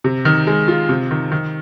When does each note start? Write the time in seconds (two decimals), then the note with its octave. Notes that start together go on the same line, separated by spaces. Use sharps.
0.04 C3
0.25 D#3
0.47 G#3
0.68 F4
0.89 C3
1.11 D#3
1.32 D#3